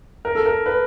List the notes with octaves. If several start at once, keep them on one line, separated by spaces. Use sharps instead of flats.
A#4
A4
A#4
B4